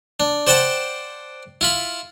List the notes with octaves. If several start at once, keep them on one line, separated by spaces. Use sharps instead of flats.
D4
C5 D5 F#5 G5 A5
E4 F4 B5